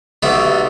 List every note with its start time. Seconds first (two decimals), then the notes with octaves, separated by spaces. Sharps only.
0.23 B1 B2 G3 E5